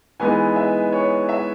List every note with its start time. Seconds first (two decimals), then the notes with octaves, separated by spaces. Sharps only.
0.20 E3 G#3 B3 D#4 G#5
0.56 E5
0.92 C#5
1.29 E5